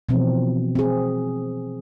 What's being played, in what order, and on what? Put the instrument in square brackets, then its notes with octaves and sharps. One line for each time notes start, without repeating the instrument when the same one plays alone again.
[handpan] B2 E3 F3 C4
C4 G#4